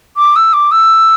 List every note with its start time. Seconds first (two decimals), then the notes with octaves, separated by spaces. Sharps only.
0.17 D6
0.36 E6
0.53 D6
0.71 E6